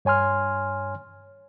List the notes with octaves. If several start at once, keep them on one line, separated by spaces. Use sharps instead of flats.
G2 C#5 G#5 C6 F6